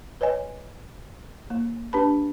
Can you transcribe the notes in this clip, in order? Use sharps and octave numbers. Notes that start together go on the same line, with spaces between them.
B4 C#5 D#5 G#5
A#3
D4 G4 B4 A5 B5